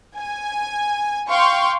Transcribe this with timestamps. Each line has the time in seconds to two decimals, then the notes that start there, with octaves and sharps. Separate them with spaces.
0.17 G#5
1.30 F5 G5 C6 C#6